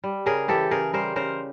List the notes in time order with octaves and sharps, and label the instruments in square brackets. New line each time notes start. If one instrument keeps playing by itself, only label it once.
[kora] G3
C#3 G#4 A#4
E3 G4 A4
C#3 G#4 A#4
G3 A#4 C5
C#3 A#4 C5